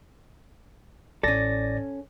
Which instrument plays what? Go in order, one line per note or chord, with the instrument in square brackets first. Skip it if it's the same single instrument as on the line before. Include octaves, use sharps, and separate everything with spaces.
[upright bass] A1 [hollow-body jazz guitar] C#4 A4 [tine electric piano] D5 A6 A#6